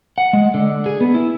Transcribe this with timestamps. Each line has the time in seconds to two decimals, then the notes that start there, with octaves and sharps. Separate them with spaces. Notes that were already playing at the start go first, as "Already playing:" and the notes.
0.18 F#5
0.33 G#3
0.54 D3
0.86 G#4
1.01 B3
1.14 E4